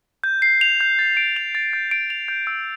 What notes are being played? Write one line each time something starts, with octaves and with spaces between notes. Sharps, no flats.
G6
C7
F7
G6
A6
D7
F7
A6
G6
D7
F7
G6
E6